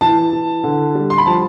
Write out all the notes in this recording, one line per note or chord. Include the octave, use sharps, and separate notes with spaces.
E3 A5
E3
D3
G3
C6
B5
F3 A5